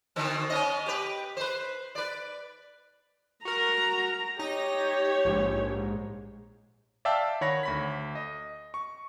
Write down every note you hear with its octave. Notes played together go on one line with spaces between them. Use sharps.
B2 D3 C4
B3 C#4 D#5
G4 B4
B4 C5
B4 D5
F#4 A#4 A#5
D#4 G4 C#5 A#6
A#1 G#2
D5 E5 F5 G5 A5 E6
D#3 C#5 F#5 B5 A#6
D2 B5 B6
D#5
C#6